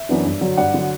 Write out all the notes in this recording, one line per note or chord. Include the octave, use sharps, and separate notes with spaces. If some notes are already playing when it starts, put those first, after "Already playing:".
Already playing: E5
F#2 E3 B3 D4
G2
D3 F#3
G2 D5 F#5
D3 F#3